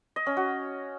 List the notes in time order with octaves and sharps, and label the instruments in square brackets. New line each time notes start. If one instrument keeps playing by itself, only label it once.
[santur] D#5
C#4
F#4